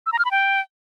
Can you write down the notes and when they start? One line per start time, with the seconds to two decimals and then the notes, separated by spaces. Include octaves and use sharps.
0.06 E6
0.13 A#5
0.19 F6
0.25 B5
0.31 G5